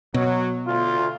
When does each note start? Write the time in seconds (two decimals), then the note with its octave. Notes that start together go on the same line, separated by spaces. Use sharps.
0.14 B2 F#3
0.67 D2 F4